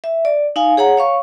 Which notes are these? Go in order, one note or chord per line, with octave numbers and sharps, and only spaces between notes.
E5
D5
D#4 F5 G#5
G#4 C#5 F#5 A#5
C#5 F5 C#6